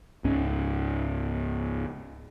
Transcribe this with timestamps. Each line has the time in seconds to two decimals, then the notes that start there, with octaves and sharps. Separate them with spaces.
0.24 C#2 G#2 C#4